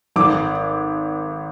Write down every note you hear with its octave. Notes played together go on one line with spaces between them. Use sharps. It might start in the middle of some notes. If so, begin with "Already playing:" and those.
G#1 D6